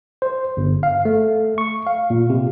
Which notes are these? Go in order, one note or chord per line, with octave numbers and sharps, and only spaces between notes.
C5
G1
F5
A3
C#6
F5
A#2
C3